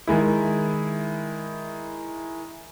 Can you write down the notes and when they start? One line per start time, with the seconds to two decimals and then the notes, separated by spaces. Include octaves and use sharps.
0.07 D#3 G#3 E4